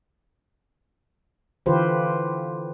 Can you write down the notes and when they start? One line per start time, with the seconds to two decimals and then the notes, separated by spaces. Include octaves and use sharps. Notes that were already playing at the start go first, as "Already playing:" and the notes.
1.66 D3 E3 F4 G4 B4 C5